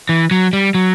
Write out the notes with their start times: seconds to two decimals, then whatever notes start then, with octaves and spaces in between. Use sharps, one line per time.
0.09 E3
0.31 F#3
0.53 G3
0.75 F#3